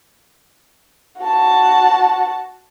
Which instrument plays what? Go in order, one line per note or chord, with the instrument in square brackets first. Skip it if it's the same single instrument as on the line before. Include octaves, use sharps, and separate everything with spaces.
[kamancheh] F#4 A5